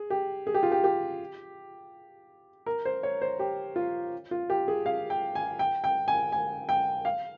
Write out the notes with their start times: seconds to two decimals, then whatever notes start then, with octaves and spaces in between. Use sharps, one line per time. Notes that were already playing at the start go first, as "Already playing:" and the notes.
Already playing: G#4
0.10 G4
0.47 G#4
0.54 G4
0.63 F4
0.72 G4
0.84 G4
2.66 A#4
2.85 C5
3.03 C#5
3.22 C5
3.39 G4
3.76 F4
4.31 F4
4.50 G4
4.68 G#4
4.86 F5
5.10 G5
5.35 G#5
5.59 G5
5.84 G5
6.08 G#5
6.32 G#5
6.69 G5
7.05 F5